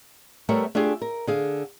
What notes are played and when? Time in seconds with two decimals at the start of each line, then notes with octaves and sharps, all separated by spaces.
0.49 G3 A3 B3 A#4 C#5 E5
0.75 A3 D4 F4 G4 G#4
1.02 A#4
1.27 D3 G#4 F5